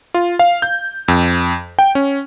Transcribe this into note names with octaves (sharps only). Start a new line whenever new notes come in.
F4
F5
G6
F2
G5
C#4